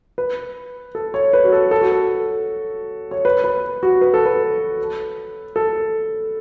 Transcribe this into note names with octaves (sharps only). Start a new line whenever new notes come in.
B4
A4
C#5
B4
F#4
A4
A4
F#4
A4
C#5
B4
B4
F#4
B4
A4
B4
A4